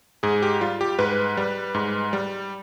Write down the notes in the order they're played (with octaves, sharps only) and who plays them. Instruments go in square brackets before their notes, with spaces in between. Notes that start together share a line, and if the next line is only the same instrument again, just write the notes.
[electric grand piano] G#2 G#4
G4
G3 F4
G4
G#2 B4
G3
G#2
G3